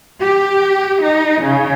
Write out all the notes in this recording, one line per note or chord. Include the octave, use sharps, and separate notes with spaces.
G4
D#4
C#3